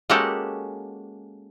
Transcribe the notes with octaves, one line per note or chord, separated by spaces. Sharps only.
G#3 A#3 C#4 F#4 G4 A4